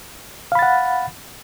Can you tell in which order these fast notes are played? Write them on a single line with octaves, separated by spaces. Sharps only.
F5 B5 A6 F#5